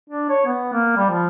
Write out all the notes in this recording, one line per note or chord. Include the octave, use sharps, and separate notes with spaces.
D4
C#5
B3
A#3
G3
F3